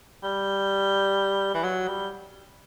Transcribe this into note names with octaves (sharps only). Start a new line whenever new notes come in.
G3
E3
F#3
G3